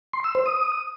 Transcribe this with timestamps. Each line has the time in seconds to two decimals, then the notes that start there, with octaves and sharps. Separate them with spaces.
0.13 C6
0.24 E6
0.35 C5
0.46 D#6